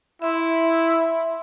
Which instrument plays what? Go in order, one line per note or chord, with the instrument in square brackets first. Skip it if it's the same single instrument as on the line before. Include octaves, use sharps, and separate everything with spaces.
[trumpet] E4 [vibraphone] E5 C6